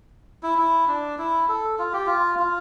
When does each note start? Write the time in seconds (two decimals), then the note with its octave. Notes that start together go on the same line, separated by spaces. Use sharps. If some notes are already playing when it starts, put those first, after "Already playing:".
0.43 E4
0.58 E4
0.88 D4
1.18 E4
1.48 A4
1.79 F4
1.93 G4
2.06 F4
2.39 F4